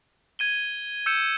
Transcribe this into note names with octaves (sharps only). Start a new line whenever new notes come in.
G#6 D#7 G7
E6 G6 C#7 E7